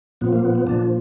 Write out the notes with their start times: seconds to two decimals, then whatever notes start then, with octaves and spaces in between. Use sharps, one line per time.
0.21 A#2 F3 B3
0.33 A#3
0.44 B3
0.55 B3
0.67 A#2 F3 D4